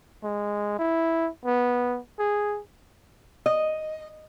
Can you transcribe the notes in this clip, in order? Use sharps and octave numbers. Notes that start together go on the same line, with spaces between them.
G#3
E4
B3
G#4
D#5